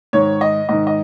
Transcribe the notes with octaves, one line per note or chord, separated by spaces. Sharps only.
G#2 D#3 C#5
D#5
G#2 D#3 D#5
D#5